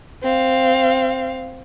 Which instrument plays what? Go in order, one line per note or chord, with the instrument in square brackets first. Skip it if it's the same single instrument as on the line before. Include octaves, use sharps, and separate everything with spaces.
[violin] C4 F5